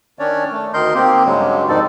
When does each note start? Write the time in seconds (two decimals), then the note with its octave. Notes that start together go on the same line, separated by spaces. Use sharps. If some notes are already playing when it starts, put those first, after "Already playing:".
0.19 D#3 C#4 D4 C#5 D5
0.52 A3
0.73 D2 D#3 A#4 D#5 C6 G6
0.95 D#3 A#3 C4 G4
1.26 G2 C#3 F#3 G#3
1.68 F2 G#2 D#3 D#4 A4 D5